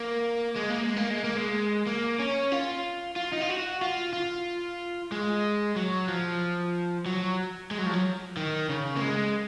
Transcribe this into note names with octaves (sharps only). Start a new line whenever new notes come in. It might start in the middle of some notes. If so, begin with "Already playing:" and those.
Already playing: A#3
G#3
A#3
G#3
A#3
G#3
A#3
G#3
A#3
C#4
F4
F4
D#4
F4
F#4
F4
F4
G#3
F#3
F3
F#3
G#3
F#3
F3
F#3
D#3
C#3
A#3
G#3